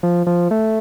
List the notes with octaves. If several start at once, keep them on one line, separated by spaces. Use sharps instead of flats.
F3
F3
A3